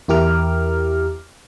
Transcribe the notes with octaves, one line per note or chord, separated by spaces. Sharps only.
E2 E4 G4 A#4 D6 F6